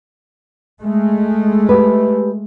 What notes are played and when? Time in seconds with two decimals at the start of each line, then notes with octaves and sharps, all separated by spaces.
0.82 G#3 A3
1.69 G4 B4